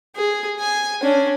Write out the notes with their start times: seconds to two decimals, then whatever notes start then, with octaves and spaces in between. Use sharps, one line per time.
0.15 G#4
0.60 G#5
1.03 C#4 D4